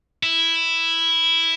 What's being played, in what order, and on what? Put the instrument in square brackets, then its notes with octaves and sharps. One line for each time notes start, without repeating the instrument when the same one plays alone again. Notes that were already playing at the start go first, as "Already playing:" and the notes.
[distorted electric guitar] E4